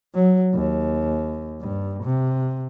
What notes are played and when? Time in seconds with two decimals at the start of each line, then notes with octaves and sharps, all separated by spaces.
0.15 F#3
0.54 D#2
1.61 G2
2.04 C3